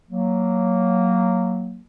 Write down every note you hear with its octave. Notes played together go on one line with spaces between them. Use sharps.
F#3 A#3